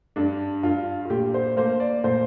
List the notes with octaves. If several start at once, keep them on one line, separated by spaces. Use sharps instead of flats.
G2 D4
G2 F4
F4
A#2 G4
C5
A#3 C5
D5
A#2 C5